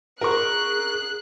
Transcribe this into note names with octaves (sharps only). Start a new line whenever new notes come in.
G#4 A#4 C#6 F#6